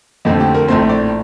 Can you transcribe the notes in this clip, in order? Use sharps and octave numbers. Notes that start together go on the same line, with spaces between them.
F2 D3 F3 A3 C4 D#4
G4
A#4
A#1 A2 A3 C4 C5
D5